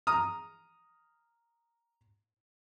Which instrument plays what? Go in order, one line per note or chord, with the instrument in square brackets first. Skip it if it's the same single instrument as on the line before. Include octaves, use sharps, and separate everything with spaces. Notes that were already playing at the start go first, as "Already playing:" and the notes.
[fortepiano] A#5 D#6 F6